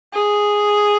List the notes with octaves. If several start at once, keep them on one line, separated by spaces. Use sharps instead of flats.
G#4